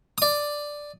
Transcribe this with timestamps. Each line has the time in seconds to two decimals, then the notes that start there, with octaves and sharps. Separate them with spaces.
0.18 D5 D#6